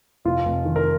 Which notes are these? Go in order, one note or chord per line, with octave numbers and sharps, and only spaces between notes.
F1 F4
F1
D#3
A#4